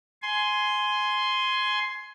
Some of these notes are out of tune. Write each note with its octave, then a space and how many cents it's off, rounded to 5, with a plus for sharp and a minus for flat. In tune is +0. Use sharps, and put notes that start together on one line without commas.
G#5 +15 C6 +0